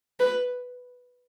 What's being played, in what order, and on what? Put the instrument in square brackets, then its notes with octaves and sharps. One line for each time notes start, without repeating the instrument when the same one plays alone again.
[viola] B4